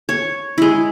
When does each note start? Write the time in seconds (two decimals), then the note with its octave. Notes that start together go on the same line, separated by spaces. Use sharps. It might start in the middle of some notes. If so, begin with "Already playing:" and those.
0.09 C#5
0.58 G#3 E4